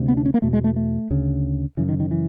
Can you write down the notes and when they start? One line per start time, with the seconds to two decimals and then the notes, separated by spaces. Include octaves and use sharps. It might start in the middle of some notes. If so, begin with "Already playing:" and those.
Already playing: D2 C3
0.08 B3
0.17 D4
0.26 C#4
0.34 A#3
0.42 E2 B2 A3
0.53 G#3
0.64 A3
0.76 A3
1.10 D2 C#3
1.77 F#2 C#3 E3
1.89 D#3
2.00 D#3
2.11 E3